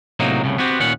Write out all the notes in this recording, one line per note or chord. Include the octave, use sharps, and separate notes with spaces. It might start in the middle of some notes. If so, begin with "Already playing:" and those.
A2 C3 F#3 A#3 D#4
C2 A2 C#3
B3 C4 F#4 G4
D#2 A#2 B3 C#4 F#5